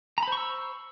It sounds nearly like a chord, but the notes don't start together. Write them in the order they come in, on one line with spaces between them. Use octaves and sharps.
A#5 B5 C5 C#6 E6